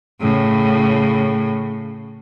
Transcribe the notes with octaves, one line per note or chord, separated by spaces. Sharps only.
A2 C#3